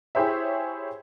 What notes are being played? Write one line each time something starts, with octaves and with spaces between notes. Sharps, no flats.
E4 G4 G#4 C5 C#5 E5